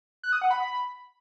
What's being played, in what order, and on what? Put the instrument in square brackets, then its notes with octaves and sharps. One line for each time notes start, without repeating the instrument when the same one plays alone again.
[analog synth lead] F#6
D#6
F#5
B5